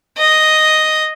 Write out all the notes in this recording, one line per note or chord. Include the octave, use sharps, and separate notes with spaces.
D#5